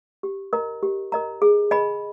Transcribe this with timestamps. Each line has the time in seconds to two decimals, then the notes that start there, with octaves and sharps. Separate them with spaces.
0.23 G4
0.53 A#4 D#5 A#5
0.83 G4
1.12 A#4 D#5 A#5
1.42 G#4
1.71 D#5 G#5 B5